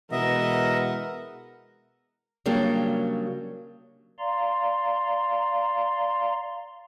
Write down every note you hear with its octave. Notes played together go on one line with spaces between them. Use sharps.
B2 E3 G#3 A#4 B4 D#5 E5 F#5
C#3 F#3 G3 A#3 D4
D5 F5 A#5 C6